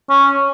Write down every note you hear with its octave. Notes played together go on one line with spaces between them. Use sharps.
C#4